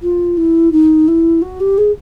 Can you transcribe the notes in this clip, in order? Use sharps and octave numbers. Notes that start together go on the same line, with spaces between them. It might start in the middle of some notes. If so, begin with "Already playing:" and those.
F4
E4
D#4
E4
F#4
G4
G#4